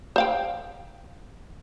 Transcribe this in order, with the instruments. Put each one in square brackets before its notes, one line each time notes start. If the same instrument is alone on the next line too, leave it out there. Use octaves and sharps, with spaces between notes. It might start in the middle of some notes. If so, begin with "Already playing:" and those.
[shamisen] C5 F5 G5